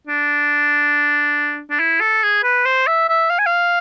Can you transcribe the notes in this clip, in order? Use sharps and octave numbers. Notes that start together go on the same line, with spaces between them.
D4
D4
E4
A4
G#4
B4
C5
E5
E5
F5
G#5
F5